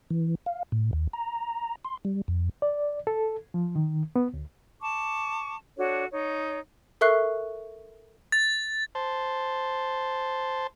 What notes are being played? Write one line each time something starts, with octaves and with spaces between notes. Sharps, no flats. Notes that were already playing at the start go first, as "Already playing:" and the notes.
E3
F5
A2
D#2
A#5
C6
G3
F2
D5
A4
F3
D#3
B3
D2
A5 C#6 D6
D4 F#4 A4 C#5
D#4 C#5
A4 A#4 E5 C#6 F#6 C7
A6
C5 A5